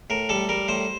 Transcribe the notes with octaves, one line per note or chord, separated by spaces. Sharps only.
A2 A#4
G3 A4
G3 A#4
A2 C5